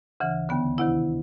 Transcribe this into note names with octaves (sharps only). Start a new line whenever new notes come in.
D2 C#3 E3
D#2 D3 B3
D2 C3 D#3 E4